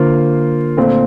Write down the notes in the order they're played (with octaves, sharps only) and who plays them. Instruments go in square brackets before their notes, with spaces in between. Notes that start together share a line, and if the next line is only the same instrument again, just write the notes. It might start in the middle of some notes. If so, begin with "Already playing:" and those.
Already playing: [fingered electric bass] D3 [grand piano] A#3 F4 C5
[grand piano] A#2 A3 C4